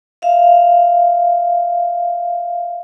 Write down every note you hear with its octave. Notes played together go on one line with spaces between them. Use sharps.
E5 F5